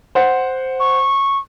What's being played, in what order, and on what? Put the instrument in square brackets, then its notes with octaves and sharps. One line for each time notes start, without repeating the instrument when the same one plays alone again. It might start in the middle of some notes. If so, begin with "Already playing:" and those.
[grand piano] C5 F#5
[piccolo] C#6